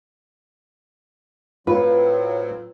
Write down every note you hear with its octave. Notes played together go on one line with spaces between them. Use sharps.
A2 F#3 C4 F4 B4